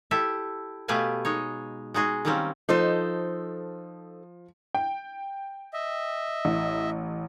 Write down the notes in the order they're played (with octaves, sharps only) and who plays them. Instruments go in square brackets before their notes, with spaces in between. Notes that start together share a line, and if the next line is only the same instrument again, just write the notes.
[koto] E4 G4 A4 E5
B2 A3 G4 B4 F5 G#5
G#3 D#4 C#5
G#3 D#4 F#4 G#4
D#3 F#3 G3 A#3 C4 C#4
[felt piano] F3 [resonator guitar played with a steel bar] D#4 A4 C5
[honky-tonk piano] G5
[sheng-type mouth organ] D#5 E5
[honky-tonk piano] A1